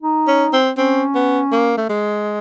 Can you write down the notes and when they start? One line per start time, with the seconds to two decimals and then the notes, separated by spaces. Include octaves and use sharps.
0.03 D#4
0.28 C#4
0.53 C4
0.77 C4 C#4
1.15 B3
1.52 A#3
1.77 A3
1.89 G#3